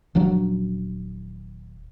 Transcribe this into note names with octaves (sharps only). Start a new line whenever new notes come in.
D#1 F3 F#3 D4